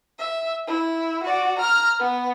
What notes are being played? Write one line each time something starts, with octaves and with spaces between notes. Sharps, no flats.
E5
E4
F#4 D5
A#5 F6
B3